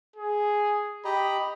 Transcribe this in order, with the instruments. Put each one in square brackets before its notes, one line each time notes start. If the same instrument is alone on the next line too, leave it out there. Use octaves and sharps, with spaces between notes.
[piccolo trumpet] G#4
[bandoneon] G4 D#5 A#5 [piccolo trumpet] B5